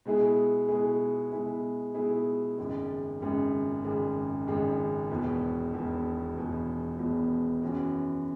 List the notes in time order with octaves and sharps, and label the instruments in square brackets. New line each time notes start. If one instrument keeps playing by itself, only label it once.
[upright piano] B2 G#3 E4 G#4
B2 G#3 E4 G#4
B2 G#3 E4 G#4
B2 G#3 E4 G#4
G#1 F#2 C#3 G#3
G#1 F#2 C#3 G#3
G#1 F#2 C#3 G#3
G#1 F#2 C#3 G#3
E1 E2 B2
E1 E2 B2
E1 E2 B2
E1 E2 B2
F#2 E3 C#4 F#4